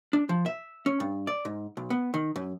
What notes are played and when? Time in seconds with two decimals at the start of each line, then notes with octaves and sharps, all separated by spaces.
0.13 D4
0.29 F3
0.46 E5
0.86 C#4
1.00 G2
1.27 D5
1.45 G#2
1.77 B1
1.90 B3
2.14 D#3
2.36 F#2